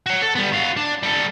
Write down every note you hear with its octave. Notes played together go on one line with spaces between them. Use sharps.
F#4 C#5
A4
G3 B3
F#4 F5
D4
G3 A4